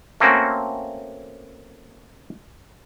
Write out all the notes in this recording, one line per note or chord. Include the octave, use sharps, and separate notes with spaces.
A3 A#3 C4 C#4 F#4